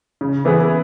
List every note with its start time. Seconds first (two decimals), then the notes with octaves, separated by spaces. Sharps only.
0.21 C#3
0.45 E3 B3 E4 G#4